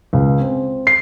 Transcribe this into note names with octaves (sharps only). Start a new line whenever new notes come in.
C#2
C4
C7